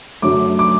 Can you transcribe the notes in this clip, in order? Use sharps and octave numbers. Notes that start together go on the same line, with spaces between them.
F#2 D3 F#3 A3 D6
D6